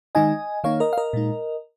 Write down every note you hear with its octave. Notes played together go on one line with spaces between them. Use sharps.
D#3 G#3 D#4 D#5 G#5
D#3 A#3 D#4 C#5 F5
A#4 D#5
F5
A#4 D#5
A#2 G#3 D#4